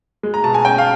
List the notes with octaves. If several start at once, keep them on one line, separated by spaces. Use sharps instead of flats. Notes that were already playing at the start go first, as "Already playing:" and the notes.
G#3
A#5
B2 A5
G#5
C#4 G5
F5